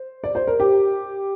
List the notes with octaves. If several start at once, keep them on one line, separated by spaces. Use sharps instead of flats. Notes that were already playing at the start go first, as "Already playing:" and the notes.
Already playing: C5
D5
C5
A#4
G4